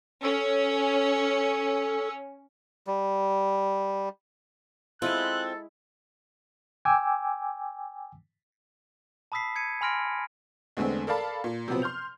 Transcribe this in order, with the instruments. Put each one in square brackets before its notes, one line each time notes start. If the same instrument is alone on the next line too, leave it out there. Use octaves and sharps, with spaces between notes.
[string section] C#4 [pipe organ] A4
[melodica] G3
[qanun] G#3 E4 G#5 [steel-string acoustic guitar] C4 F4 [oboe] A4 [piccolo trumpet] F#6
[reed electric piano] G5 G#5 D6 E6
[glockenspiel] A5 B5 D#6 E6 B6 C7
G#6 C#7 D#7
G#5 B5 C6 F6 A#6 D7
[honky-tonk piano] E2 D3 G#3 A3 C4
A4 A#4 D5 F5 A5 B5
A#2
C3 F3 F#3 B3 C4
C6 F6 G6 F7